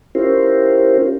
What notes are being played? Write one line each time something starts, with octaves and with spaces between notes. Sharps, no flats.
C#4 E4 F4 G4 A#4 C5